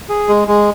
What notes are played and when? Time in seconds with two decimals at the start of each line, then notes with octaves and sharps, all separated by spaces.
0.09 G#4
0.29 G#3
0.48 G#3